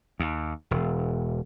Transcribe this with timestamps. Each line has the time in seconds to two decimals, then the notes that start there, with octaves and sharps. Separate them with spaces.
0.20 D#2
0.71 E1